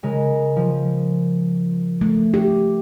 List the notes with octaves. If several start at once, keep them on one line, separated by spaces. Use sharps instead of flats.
C#3 G#3 A#4
F3
A3
G4